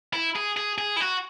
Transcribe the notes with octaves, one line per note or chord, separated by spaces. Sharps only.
E4
G#4
G#4
G#4
E4
F#4